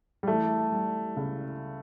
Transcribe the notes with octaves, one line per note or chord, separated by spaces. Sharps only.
G3
E3 A3
G3
C#2